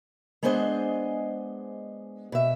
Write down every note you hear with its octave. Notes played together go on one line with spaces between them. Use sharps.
G#3 B3 D4 G#4 C5 D#5
B2 E5